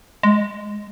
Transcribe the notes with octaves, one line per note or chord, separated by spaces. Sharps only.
G#3